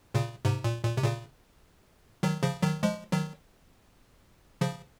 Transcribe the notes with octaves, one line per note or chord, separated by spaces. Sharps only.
A#2 C#3
G#2 C3
A#2
A#2
C3
A#2 C#3
D#3 F#3
C#3 F3
D#3 F#3
F3 G#3
D#3 F#3
C#3 F3